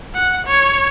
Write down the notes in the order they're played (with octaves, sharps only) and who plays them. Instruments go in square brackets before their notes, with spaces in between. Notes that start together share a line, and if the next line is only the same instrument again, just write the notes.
[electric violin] F#5
C#5